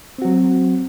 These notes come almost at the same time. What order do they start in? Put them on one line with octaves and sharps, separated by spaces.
C4 F#4 F#3